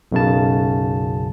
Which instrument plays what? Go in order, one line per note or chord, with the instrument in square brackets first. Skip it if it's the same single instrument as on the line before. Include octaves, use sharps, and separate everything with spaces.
[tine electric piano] B1 F#2 C#3 A5